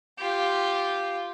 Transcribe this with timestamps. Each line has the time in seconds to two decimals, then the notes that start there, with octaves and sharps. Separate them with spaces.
0.19 F4 G4